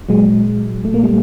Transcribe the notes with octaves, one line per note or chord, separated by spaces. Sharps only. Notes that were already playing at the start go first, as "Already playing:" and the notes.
A#2 F#3 G#3
A#2 A3
A#3
G3 A3